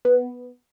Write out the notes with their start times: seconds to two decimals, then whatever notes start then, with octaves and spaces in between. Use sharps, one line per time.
0.05 B3